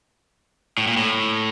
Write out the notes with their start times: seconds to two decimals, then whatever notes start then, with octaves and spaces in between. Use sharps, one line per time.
0.78 A2
0.87 A#2
0.97 A2